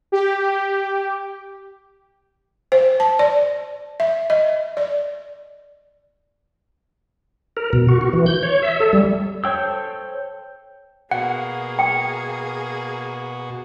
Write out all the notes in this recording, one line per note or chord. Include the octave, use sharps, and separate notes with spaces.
G4
C5
A5
D5
E5
D#5
D5
A#4
B2
F#4
F#4
E3
G6
C#5
E5
A4
G3
A4 C5 C#5 G5 E6
B2 A#3 F#4 G#4 F#5
G5